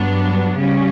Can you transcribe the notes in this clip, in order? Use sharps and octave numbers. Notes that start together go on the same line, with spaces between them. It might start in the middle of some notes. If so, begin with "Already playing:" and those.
Already playing: G2 F#3 B3 D4
C#3 G3 C#4